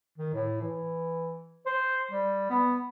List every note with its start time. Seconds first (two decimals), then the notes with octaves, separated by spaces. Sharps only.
0.18 D#3
0.34 A2
0.62 E3
1.66 C5
2.11 G3
2.50 B3